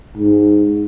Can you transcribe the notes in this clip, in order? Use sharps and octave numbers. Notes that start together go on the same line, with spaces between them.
G#2